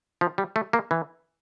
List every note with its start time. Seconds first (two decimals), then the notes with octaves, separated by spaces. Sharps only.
0.21 F3
0.38 G3
0.56 A3
0.73 A#3
0.91 E3